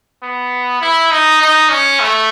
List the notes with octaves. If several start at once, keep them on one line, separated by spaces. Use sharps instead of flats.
B3
E4
D#4
D#4
C#4
A3